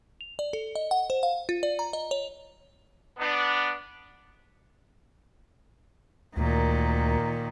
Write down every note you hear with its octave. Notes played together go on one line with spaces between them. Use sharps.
F7
D5
A4
D#5
F#5
C5
F5
F4
D5
A#5
D#5
C#5
B3 D4
D2 A#2 D#3